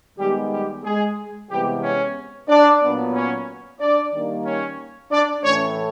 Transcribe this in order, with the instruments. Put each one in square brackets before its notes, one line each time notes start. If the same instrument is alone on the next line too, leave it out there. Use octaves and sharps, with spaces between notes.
[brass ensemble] D#3 G3 G#3 B3 G4
G3 G4
G#3 G#4
C3 E3 G3 G#3 B3 G4
C#4 C#5
D4 D5
A#2 F#3 B3
C#4 C#5
D4 D5
D#3 G3 A#3
C#4 C#5
D4 D5
A2 E3 A3 C#4 C#5